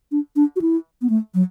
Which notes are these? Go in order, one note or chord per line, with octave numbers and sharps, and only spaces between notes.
D4
D4
F#4
E4
B3
A3
F#3